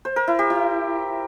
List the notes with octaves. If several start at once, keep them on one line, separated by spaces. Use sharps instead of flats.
C5
A#4
E4
G4
E4